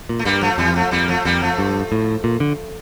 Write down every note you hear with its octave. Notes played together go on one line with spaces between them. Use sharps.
A#2
A3
G2 G3 A#3
F3 A3
F2 E3 G3
F3 A3
F2 G3 A#3
F3 A3
F2 G3 A#3
F3 A3
G2
A2
A#2
D3